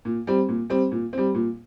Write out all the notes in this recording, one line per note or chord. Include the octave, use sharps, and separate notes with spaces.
A#2
G3 C4
A#2
G3 C4
A#2
G3 C4
A#2